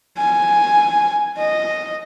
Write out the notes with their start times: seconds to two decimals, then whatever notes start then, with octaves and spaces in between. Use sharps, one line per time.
0.18 G#5
1.37 D#5